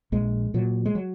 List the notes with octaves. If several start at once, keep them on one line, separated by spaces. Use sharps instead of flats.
A#1 G#3
A#2 F#3
G#3
F#3